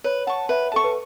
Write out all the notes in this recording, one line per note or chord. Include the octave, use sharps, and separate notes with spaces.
B4 C#5
F#5 A5 C#6
B4 E5
A4 A5 C#6
B4